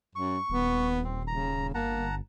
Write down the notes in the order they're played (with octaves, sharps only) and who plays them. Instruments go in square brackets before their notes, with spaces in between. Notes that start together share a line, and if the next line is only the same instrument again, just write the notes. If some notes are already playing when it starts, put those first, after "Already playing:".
[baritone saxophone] F#2 [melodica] C#6
[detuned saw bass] D#1 [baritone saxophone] B3
[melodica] C4
[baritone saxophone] C#3 [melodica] A#5
[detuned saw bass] G1 [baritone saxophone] A#3 [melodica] F#5 A5 A#5